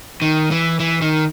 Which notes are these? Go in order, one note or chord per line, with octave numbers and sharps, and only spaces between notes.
D#3
E3
E3
D#3